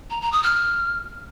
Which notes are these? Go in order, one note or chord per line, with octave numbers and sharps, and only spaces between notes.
A#5
A#5
D#6
F6